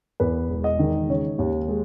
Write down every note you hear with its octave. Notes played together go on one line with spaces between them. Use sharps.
E2 B4
E1
D#5
D#3
C#3 C#5
D#2
G#3